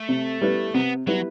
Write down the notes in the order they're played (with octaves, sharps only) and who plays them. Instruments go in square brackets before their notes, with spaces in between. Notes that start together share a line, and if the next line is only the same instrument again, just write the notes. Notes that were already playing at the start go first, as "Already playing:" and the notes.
Already playing: [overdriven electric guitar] A3
[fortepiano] C3
G3 B3 E4 B4
[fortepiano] C3 [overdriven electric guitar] B3
[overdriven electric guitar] F#3 [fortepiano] G3 B3 E4 B4